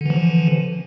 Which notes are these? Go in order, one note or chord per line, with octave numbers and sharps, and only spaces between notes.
D3 E3 F3